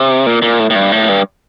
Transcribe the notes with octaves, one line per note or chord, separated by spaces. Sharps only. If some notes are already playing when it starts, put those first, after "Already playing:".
Already playing: C3
A#2
A#2
A2
A2
G2
A2
G2